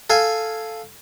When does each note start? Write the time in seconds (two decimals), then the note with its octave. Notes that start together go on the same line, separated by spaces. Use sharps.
0.10 A4 F5 G#5